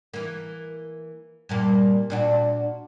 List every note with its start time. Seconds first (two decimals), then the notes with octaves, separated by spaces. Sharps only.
0.14 E3 A#3
1.49 G2 A#2 A#3
2.10 A#2 D4 F#4